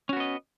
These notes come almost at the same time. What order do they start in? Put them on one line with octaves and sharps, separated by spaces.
C#4 F#4 B3 D#5